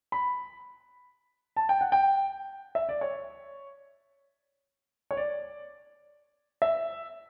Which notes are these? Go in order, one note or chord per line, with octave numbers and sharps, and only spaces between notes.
B5
A5
G5
F#5
G5
E5
D5
C#5
C#5
D5
E5